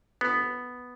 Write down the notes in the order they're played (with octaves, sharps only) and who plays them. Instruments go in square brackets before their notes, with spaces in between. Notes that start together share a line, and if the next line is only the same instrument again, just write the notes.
[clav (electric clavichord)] G1 B3